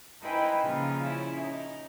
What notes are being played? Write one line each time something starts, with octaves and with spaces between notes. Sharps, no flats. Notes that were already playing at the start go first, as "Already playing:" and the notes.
D#4 E4 B4 C5 G5 G#5
A#2 C#3 F3 D#4 F4
C#4 E4
D#4